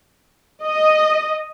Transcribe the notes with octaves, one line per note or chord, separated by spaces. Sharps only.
D#5